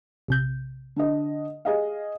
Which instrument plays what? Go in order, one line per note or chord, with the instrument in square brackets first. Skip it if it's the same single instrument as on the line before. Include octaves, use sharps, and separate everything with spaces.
[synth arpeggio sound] A#1 C3 G6
[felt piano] D3 D4 D#5
G#4 D#5 F5